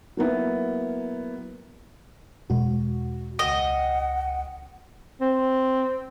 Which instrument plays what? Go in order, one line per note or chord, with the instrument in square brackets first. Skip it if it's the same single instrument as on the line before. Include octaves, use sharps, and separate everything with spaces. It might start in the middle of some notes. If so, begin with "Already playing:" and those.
[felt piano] F#3 A#3 B3 E4
[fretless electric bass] E2 B2 G#3 [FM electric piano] F#4
[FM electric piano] C#2 G5 [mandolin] D#5 [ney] F#5
[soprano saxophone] C4